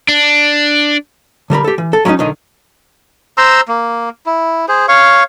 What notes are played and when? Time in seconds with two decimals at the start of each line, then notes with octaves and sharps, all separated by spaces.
0.08 D4
1.50 D3 G3 A#4 B5
1.64 G4 A4
1.78 E3
1.93 A4
2.05 F#3 G3 A#3 C#4 D#4
2.19 B1 D3 D#3 D#5
3.37 C5 A#5 C6 E6
3.68 A#3
4.26 E4
4.69 G#4 C5
4.88 C#5 F5 C#6